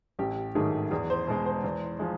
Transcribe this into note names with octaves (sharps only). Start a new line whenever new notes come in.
A1 G4
G#2 D#3 F#3 A3 G#4
E2 G#4
C5
B2 G#3
C5
E2
F3 G#3